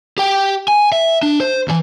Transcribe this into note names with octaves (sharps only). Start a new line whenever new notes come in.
G4 G5
G#5
E5
D4
C5
D2 E3